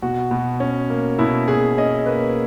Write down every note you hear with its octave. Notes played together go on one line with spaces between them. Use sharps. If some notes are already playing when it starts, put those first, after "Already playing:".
B2 F#4
B2
C#4
A#3
B2 E4
B2 G#4
C#4 D#5
A#3 B4